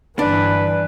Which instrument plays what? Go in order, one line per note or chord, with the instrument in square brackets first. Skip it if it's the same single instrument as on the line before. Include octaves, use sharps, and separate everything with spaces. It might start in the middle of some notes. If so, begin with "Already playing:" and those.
[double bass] G1 E3 [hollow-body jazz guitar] D4 [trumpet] B4